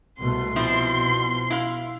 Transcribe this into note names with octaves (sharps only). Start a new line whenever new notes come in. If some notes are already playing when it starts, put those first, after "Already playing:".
C2 B2 A3 C6
B2 F3 C4 E4
E4 F5